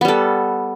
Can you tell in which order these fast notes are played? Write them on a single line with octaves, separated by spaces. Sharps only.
B3 G3 A4